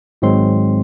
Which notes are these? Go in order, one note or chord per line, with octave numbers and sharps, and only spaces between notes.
G#1 G#2 F#3 G#3 C4 C6